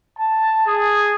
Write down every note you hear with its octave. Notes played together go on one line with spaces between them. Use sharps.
A5
G#4